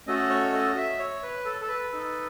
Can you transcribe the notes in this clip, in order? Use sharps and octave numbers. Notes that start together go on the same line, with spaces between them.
A3 C#4 F#4 A4 D#5
C#5
D#5
E5
C#5
B4
A4
A4
B4
D#4 A4